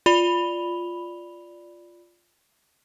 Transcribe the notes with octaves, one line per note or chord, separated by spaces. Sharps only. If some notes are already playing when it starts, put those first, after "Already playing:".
F4 D5 B5 F7 G7